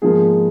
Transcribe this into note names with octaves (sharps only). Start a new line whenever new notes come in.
G#2 F3 A#3 G#4